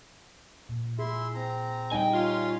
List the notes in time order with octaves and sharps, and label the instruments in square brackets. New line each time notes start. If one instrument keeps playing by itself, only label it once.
[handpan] A#2
[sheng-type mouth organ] E4 E5 C6 [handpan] G#4
[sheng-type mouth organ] C4 A#5
[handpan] G3 D#4 D#5 [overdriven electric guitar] G5 G#5
[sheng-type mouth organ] C#4 F5 C6 [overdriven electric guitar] F4